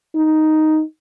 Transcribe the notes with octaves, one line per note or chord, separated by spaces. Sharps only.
D#4